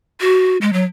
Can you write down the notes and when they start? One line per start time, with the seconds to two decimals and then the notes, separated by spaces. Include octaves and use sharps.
0.21 F#4
0.62 G#3
0.73 F#3